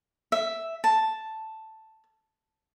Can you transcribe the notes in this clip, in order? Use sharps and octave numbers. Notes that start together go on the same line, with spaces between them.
E5
A5